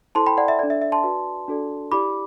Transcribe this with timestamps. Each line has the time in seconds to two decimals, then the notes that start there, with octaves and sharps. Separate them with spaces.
0.15 E4 A4 C5 A5 C6
0.26 G5 B5
0.37 D5 F#5
0.48 E5
0.59 D4 A4 D5
0.70 E5
0.81 E5
0.92 A5 C6
1.04 F#4 B4 D5
1.48 D4 F#4 A4 D5
1.91 E4 G4 D5 B5 D6